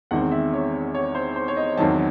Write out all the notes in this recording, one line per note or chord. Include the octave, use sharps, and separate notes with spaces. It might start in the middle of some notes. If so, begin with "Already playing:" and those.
E2 D#3 G#3 C4 F#5
E5
C#5
C#5
C5
C5
C#5
D#5
E2 D#3 F#3 C4 A5